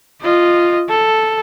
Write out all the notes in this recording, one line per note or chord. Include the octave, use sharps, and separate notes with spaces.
F4 D#5
A4